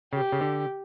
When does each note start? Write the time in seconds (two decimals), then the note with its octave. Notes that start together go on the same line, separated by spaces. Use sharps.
0.13 C#3 G4
0.32 C#3
0.41 D3